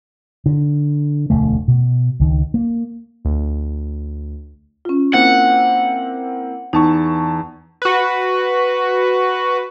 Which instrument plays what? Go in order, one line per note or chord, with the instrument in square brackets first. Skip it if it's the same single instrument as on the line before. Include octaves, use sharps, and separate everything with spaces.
[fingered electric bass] D3
E1 D2 A3
B2
C#2 D#3
A#3
[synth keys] D2
[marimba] C#4 F4
[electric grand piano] A#3 C4 E4 [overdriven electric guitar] F#5
[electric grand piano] E2 A5 C#6 [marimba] D#4
[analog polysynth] F#4 B4